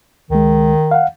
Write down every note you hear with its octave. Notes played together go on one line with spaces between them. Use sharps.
C#2 D#3 G#3
F5 F#5